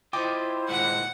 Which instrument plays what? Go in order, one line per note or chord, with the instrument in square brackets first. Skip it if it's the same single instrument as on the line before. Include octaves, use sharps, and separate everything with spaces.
[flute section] E4 C5 [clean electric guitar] F4 D#5 [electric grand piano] G5 D6
[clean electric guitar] D#2 A#2 G#3 [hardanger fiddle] F#5